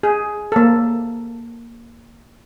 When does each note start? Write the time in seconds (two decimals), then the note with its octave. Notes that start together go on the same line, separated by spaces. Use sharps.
0.03 G#4
0.52 A#3 A4